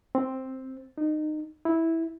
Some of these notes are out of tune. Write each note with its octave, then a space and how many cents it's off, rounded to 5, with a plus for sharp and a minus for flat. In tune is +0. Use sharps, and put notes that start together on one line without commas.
C4 +5
D#4 -25
E4 -10